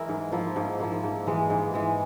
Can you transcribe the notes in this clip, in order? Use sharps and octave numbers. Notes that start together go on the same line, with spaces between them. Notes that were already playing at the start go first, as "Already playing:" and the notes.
Already playing: E3 G#3 E4 A#4
G#2
F3 A#3 E4
G#2
F3 A#3 E4
G#2
E3 G#3
G#2
E3 G#3